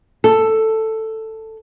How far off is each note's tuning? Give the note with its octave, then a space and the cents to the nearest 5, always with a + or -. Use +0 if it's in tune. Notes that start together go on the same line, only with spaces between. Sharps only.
A4 +5